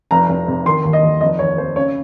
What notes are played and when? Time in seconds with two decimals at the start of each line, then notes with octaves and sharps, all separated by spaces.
0.11 F1 A#5
0.29 F1
0.48 C3
0.66 D#3 C6
0.84 D#2
0.93 D#5
1.02 D#2
1.21 F1 D#5
1.39 D#2 C#5
1.58 F1 C5
1.76 C#3 C#5